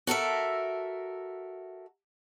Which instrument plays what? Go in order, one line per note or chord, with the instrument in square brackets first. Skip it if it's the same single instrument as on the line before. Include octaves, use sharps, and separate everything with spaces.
[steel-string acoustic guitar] F#4 A4 A#4 E5